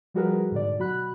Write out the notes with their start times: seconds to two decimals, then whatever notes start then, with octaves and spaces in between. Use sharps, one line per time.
0.14 F3 G3 F#4 G#4 A#4 B4
0.52 G#2 B2 D3 D5
0.78 B2 F#3 F#4 B5 F#6